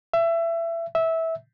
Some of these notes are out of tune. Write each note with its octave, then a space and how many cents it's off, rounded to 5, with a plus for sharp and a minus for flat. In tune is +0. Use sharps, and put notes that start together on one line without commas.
E5 +25
E5 -15